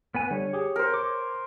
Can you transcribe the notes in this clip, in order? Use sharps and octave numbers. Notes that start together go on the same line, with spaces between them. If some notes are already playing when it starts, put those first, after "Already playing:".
B3 B4 G#5
D3 G3 C#5
G4 G#4
A#4 C5
D6